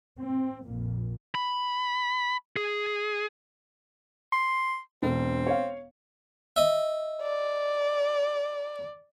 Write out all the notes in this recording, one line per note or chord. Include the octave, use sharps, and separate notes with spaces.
C4
A#1 F2 A#2
B5
G#4
C6
E1 C4
C#5 F5
D#5 E5
D5